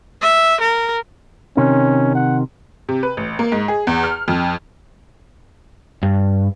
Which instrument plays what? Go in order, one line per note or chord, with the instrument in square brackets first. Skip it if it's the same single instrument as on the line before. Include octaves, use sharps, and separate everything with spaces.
[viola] E5
A#4
[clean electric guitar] C3 D#3 [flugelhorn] C#4
[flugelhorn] F#5
[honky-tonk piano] C3
B4
A1
A#3
G#2
G#4
E2
F6
F2
[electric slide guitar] G2